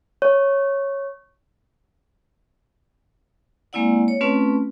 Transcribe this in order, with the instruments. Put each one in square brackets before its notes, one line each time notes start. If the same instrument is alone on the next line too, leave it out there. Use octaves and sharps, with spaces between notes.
[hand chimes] C#5
[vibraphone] G#3 A#3 C4 E4 D5 F#5
C#5
A3 C4 C#4 F4 B4